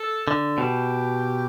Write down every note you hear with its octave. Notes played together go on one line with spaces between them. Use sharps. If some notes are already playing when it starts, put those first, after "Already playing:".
Already playing: A4
D3
B2 G4